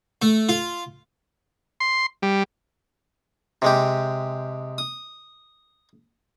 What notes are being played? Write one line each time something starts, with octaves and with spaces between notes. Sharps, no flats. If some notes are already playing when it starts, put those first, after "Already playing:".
A3
F4
C6
G3
C3 G#3 G4
D#6